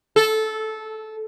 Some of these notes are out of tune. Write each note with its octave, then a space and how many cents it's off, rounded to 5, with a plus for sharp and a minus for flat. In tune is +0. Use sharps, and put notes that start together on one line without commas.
A4 -15